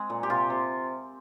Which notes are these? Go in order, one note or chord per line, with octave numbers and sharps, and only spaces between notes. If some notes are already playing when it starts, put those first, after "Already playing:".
Already playing: G#3 C4 G#4
A#2
G4
C3 F4
C3